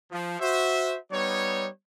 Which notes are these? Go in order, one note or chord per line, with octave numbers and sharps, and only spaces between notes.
F3
F#4 C5 E5
G3 B3 D#4 C#5